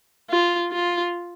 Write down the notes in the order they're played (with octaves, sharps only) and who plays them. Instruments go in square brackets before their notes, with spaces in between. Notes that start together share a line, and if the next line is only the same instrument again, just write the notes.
[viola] F4
F4